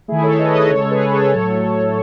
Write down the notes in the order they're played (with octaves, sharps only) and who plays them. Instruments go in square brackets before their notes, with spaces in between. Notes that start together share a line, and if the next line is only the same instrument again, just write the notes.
[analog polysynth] D#3 A3 E4 G#4
A4 C#5
B4 D#5
B4 D#5
C#3 G#3 A4 C#5
G#4 B4
A4 C#5
A2 F#3 A3